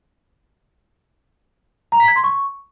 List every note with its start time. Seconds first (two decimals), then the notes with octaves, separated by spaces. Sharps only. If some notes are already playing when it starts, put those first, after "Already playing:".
1.92 A#5
2.00 B6
2.08 G#6
2.16 C6
2.24 C#6